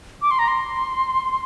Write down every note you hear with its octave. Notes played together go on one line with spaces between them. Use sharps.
D6
C6
A#5
C6